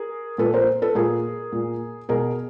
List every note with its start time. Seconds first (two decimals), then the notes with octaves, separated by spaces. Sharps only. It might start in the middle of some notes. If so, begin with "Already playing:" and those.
Already playing: G#4 A#4
0.38 A#2 A4 B4
0.54 A#4 C5
0.82 A4 B4
0.95 A#2 G#4 A#4
1.52 A#2
2.09 B2 G#4 A#4